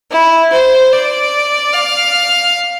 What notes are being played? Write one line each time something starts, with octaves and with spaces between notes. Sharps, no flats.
E4
C5
D5
F5